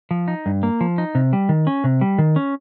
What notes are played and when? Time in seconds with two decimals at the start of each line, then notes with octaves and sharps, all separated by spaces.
0.11 F3
0.28 D#4
0.46 G2
0.63 A#3
0.81 F3
0.98 D#4
1.15 C3
1.33 G3
1.49 D#3
1.67 C#4
1.84 C3
2.01 G3
2.18 D#3
2.36 C#4